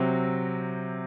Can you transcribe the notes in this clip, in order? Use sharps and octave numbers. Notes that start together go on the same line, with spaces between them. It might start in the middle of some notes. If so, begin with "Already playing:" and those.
Already playing: C3 F#3 C4